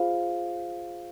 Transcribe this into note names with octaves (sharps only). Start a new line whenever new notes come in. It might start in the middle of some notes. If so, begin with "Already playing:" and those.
Already playing: F4 G#4 C5 F5